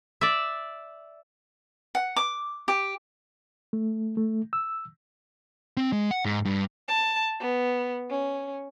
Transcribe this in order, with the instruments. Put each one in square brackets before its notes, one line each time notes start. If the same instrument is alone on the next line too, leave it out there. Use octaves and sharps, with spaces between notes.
[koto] D5 E5
[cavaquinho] F#5
D6
G4
[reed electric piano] A3
A3
E6
[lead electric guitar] C4
G#3
F#5
G#2
G2
[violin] A5
B3
C#4